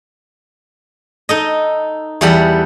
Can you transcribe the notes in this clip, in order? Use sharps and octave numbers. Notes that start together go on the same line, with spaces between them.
D#4 A4 D#5
E2 E3 G3 A4 F#5